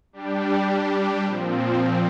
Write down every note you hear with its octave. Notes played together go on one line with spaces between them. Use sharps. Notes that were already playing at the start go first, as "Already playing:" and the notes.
G3 D4 G4
A#2 F3 C4